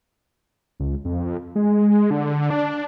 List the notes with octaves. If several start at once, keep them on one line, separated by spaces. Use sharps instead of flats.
C#2
F2
G#3
D3
D4